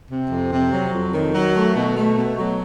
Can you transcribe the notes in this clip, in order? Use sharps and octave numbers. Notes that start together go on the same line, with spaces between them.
C3
F2
C3
F#3
F2
D#3
F#3
A3
B2
A3
B2
F#3